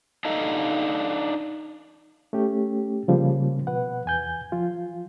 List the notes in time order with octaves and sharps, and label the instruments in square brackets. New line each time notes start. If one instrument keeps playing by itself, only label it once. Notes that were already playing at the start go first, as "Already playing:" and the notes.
[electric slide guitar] D4 D#4 A4 D#5 F5
[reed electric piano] A3 C#4 G4
C#3 F3 G3 A#3
B2 B4 F#5
E2 G#5 G6
F3 F4